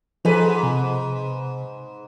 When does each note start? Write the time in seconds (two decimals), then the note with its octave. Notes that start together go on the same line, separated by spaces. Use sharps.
0.25 G#2 F3 G#4 A4 B4
0.63 C3